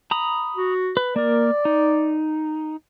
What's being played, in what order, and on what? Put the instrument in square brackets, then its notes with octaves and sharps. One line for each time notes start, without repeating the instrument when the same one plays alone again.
[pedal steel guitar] A#5 B5 D#6
[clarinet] F#4
[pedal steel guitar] B4
[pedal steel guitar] A#3 A#4 [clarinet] D5
[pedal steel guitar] D#4